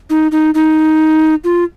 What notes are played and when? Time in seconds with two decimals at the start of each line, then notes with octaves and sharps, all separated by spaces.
0.10 D#4
0.32 D#4
0.54 D#4
1.44 F4